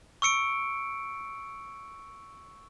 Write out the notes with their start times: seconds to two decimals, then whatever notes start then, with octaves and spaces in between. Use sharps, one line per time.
0.22 C#6 E6 C#7 D7